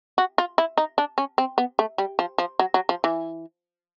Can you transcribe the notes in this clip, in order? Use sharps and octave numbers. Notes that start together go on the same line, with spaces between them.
F#4
F4
E4
D#4
D4
C#4
C4
B3
A3
G3
F3
F3
F#3
F#3
F3
E3